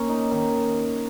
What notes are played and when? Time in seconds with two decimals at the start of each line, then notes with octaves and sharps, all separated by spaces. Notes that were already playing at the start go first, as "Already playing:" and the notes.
Already playing: A#3 C#4
0.09 D#4
0.31 D#3